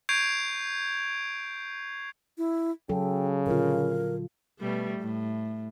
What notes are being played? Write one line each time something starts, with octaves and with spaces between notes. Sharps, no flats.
C#6 G6 G#6 C7 D7 F7
E4
C#3 F#3 A4 G5
A#2 D3 F4 A#4
B2 G3 A3
A2